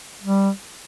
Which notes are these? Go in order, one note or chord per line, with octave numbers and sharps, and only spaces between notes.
G3